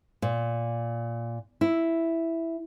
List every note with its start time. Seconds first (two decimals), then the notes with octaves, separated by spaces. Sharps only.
0.22 A#2
1.61 E4